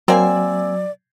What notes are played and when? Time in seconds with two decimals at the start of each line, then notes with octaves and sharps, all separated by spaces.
0.08 F#3 A#3 C4 D5 E5 G#5